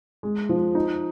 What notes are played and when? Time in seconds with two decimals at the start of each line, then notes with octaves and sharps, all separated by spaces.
0.23 G#3
0.49 F3
0.75 D#4